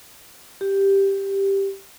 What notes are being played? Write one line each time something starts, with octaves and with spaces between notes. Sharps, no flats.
G4